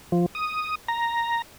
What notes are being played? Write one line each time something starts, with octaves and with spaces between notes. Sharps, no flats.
F3
D#6
A#5